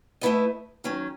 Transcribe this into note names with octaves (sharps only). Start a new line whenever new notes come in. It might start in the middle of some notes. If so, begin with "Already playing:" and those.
A3 E4 B4 D#5
D#3 F#3 C#4